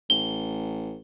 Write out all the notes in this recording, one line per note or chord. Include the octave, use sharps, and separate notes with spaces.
A1 G7